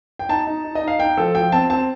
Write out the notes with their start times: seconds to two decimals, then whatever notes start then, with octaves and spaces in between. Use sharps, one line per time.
0.19 G5
0.29 D#4 A5
0.47 D#4
0.64 D#4
0.75 D#5
0.82 D#4
0.88 F5
1.00 D#4 G5
1.17 F3 A4
1.35 F3 G5
1.52 C4 A5
1.70 C4 A5